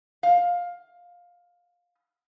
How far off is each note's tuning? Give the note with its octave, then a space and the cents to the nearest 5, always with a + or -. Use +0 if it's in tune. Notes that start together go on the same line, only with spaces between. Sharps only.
F5 +15